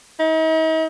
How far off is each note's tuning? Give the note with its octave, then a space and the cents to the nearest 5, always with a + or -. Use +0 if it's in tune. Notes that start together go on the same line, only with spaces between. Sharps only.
D#4 +45